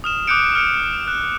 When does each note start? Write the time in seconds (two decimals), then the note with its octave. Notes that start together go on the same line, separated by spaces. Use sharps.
0.04 D#6 F6 E7
0.27 D6 D#6 F#6 G6 C#7 D7
0.55 F6 C#7 D7
1.08 F#6